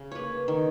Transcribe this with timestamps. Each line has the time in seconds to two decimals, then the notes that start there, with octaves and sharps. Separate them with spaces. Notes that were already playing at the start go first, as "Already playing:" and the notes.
Already playing: C#3
0.12 A#3 B4 C#5
0.48 D#3